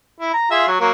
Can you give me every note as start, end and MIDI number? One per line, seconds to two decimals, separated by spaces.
0.20 0.33 64
0.33 0.50 82
0.51 0.66 65
0.51 0.66 68
0.51 0.66 76
0.68 0.80 54
0.80 0.92 54
0.80 0.92 58